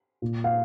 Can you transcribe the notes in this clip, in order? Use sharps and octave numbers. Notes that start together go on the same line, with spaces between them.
A#2
F5